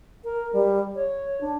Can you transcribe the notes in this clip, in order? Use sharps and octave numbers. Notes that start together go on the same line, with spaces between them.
A#4
G3
C#5
D4